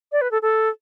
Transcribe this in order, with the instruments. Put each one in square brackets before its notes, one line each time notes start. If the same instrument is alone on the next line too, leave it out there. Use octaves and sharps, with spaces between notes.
[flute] D5
B4
A4
A4